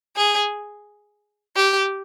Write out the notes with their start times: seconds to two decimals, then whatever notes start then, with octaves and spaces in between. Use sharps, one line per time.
0.17 G#4
1.56 G4